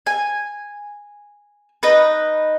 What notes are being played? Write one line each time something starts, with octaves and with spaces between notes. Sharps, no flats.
G#5
D#4 B4